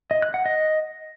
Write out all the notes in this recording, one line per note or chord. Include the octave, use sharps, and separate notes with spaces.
D#5
F#6
F#5
D#5